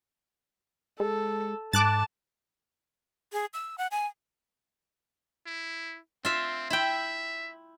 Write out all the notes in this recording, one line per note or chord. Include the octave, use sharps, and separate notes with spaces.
G#3 A4
G#2 A5 D6 F#6 A6
G#4
E6
F#5
G#5
E4
C4 F4 E5
E4 E5 G5